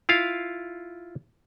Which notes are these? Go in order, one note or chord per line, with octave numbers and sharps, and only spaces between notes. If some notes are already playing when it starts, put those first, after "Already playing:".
E4 F4 F5